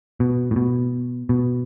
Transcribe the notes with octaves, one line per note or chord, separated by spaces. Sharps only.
B2
A2
B2
B2